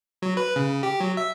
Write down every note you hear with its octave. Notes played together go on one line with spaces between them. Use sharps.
F#3
B4
C#3
G4
F#3
E5